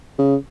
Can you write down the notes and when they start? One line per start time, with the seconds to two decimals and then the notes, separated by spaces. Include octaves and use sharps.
0.19 C#3